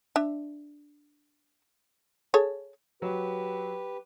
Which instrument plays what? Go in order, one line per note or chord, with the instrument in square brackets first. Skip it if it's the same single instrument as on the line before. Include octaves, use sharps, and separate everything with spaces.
[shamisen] D4 E5
G#4 A4 C#5
[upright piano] F#3 [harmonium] G4 B4